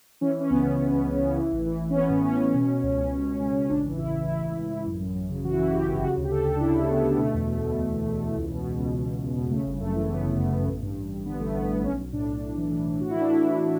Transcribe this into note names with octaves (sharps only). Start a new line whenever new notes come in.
E3 C#4
E3 C#4
C#2 B3
C#2
C#2
C#2
C#3
C#3
E3
A1
E3
A1
C#4
A1 B3
A2
A2 C#4
A1
B2
B2
C#2
C#2
C#2
C#2
C#2
C#2
A1 D4
E3
A1 E4
A1
A1 E4
A1
A1
A1
F#2
F#2
F#2
C#3
E3 F#4
E4
E3 F#4
C#3 G4
G1
C#3 F#4
D2
G4
D2 A4
D2
D4
C#3 E4
D2
A3
C#3 B3
D2
B2 A3
E2
B2
B2
E2
E2
E2
E2
C#2
B2
B2
C#2
B2
C#2
C#2
B2
C#3 A3
G1
F#2 A3
E3
E3 B3
G1
F#2
G1
A1
G2
A1
G2
D3 B3
A1 A3
A1 B3
A1 B3
B1 C#4
B1
A2 D4
B1
B1
E3
E3
E3
A2 F#4
E3 E4
D4
A2 E4
E3